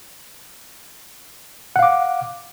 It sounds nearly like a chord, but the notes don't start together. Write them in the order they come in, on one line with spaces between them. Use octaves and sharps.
F#5 F5 D6